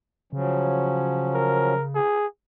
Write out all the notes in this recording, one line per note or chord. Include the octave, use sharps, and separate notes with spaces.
C#3 F3 F#3 C#4
A#4
G#4